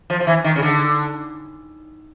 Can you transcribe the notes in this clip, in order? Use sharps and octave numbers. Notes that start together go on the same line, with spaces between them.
F3
F3
E3
D#3
C#3
D3